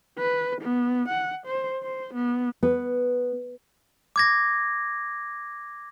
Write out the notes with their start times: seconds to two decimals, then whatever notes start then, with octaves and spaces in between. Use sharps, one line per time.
0.19 B4
0.62 B3
1.09 F#5
1.47 C5
1.83 C5
2.14 B3
2.63 B3
4.16 D6 G#6 A#6